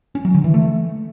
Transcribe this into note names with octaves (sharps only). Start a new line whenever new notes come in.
C#4
F#3
D3
E3
A3